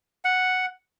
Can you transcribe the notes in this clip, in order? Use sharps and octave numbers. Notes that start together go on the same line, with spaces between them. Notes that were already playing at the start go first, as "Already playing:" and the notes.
F#5